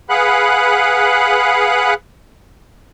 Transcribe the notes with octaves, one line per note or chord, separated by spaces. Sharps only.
G#4 B4 F5 F#5 B5 F#6